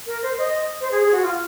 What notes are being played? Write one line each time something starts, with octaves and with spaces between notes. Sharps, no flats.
A#4
C5
D#5
C5
G#4
G#4
F#4
F4